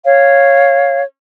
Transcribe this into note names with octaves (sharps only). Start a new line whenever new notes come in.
C#5 F5